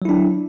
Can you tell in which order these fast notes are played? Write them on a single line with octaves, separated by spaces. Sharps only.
F#3 E4 D4